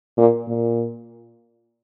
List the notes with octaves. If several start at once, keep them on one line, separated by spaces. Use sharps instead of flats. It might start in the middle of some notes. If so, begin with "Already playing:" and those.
A#2
A#2